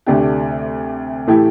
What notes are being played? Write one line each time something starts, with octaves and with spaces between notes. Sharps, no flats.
D2 C3 A3 D4 G4
A2 E3 A3 E4 G4